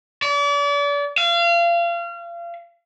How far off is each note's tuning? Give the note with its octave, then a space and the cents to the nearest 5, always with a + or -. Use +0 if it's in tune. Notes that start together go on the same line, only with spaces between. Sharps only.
D5 -40
F5 -30